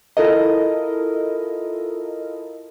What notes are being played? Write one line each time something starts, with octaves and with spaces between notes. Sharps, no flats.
E4 F4 A4 A#4 D#5